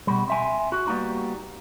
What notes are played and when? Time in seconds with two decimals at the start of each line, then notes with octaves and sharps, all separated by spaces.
0.07 B2 G3
0.28 C4 E5 G#5
0.72 F#4
0.87 G3 A#3 B3 D#4 F#4